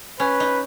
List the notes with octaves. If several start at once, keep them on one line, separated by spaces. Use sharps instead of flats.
C#4 B4
D#4